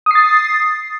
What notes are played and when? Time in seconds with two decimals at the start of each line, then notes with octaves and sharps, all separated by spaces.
0.06 D#6
0.11 C7
0.15 A6